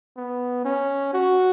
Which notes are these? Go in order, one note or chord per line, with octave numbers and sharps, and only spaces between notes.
B3
C#4
F#4